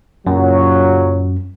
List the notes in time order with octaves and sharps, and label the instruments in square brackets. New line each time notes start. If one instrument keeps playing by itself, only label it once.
[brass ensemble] F#1 A#2 F#3 [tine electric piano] F#2